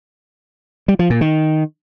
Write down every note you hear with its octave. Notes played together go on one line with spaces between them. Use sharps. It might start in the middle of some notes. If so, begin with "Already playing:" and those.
G3
F3
A#2
D#3